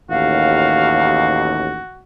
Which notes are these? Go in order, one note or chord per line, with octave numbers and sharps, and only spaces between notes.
A1 D#2 F#4 F5